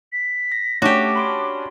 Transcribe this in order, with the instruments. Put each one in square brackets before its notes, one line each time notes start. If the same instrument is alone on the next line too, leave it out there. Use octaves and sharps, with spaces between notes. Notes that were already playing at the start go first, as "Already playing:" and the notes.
[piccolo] B6
[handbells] A#6
[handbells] A3 [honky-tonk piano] C#4 D4 [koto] F#4 G4 [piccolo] D6
[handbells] B5 C6 D7